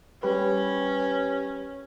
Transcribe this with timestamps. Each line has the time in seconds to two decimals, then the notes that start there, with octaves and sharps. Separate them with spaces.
0.23 G3 C#4 G4 B4